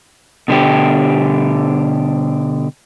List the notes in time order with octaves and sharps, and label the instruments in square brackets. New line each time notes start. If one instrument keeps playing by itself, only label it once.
[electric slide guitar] B2 D3 G3 G4